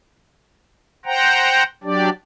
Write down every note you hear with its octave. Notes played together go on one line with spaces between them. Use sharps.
C5 F#5 G5 A#5
F#3 D4 G4 D5